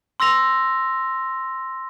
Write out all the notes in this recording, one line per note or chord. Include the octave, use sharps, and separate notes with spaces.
C6 E6 A#6 F7